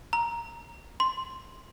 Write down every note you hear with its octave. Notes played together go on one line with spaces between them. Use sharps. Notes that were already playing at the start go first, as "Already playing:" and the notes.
A#5
C6